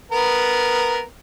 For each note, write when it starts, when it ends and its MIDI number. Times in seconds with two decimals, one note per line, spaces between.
0.12 1.02 59
0.12 1.02 70